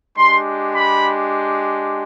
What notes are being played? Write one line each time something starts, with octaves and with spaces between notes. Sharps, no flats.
G#3 D4 G4 C6
B5